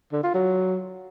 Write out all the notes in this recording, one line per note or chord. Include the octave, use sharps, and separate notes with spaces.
D3
F4
F#3